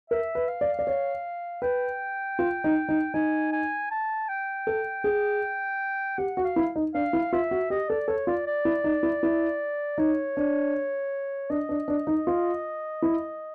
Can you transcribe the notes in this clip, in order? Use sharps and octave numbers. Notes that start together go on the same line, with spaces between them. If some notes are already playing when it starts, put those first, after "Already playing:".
A#4 E5
B4
F5
D5
D5
C#5
B4 G5
F4
D#4
D#4
D#4 G#5
G#5
A5
G5
A4
G#4
G4 F#5
F#4
F5
E4
D#4
D4 F5
E4
F4 E5
F#4
G4 D#5
A4 D5
A4 C#5
F4 D5
D5
E4
D#4
E4
E4
D#4 C#5
D4
D4 D#5
D4
D4
D#4
F4
E4